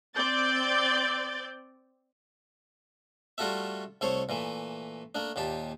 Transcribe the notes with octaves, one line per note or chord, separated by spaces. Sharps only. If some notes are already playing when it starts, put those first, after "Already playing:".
C4 D5 G6 A6
G3 A3 F4 F#4 A4 E5
C2 A3 A4 C5 C#5
A#2 E3 A3
A3 A#3 D4
D#2 A#2 G4 A5